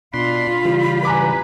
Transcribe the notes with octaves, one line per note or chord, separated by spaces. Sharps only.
B2 D4 F4 B5 C6
C#3 E3 G3
B4 G#5 A#5 D6